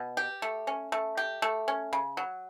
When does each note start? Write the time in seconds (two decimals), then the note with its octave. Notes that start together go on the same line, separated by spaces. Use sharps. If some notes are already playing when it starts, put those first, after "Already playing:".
Already playing: B2
0.17 G4
0.42 A3
0.67 C#4
0.92 A3
1.17 G4
1.42 A3
1.68 C#4
1.93 C#3
2.17 F#3